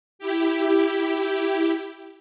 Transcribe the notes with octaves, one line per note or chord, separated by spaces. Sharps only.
E4 G4